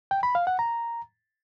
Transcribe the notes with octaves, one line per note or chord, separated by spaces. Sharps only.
G5
B5
F5
F#5
A#5